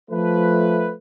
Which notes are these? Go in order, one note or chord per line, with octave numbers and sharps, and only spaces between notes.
F3 A3 B4